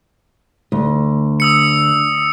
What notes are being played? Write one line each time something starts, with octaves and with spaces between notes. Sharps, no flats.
D2
D#6 E6 C#7